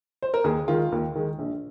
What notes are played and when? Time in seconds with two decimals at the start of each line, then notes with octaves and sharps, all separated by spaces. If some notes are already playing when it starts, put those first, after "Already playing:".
0.22 C5
0.34 A#4
0.44 D#2 G#4
0.68 D#3 G#3 F4
0.92 D#2
1.15 D#3 G#3
1.39 A#1